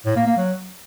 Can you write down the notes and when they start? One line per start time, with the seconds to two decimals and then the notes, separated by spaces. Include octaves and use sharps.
0.06 A2
0.16 A#3
0.26 A#3
0.37 F#3